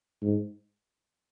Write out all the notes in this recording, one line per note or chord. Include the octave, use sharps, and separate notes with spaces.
G#2